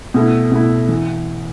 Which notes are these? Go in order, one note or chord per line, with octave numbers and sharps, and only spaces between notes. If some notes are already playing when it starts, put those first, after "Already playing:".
B2 A3 E4
B2 A3 E4
E3